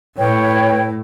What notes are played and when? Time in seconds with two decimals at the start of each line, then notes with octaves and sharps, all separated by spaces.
0.17 A2 B4 C#5 G5